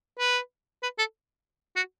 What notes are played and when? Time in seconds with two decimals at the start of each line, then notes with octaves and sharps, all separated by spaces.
0.19 B4
0.83 B4
0.98 A4
1.76 F#4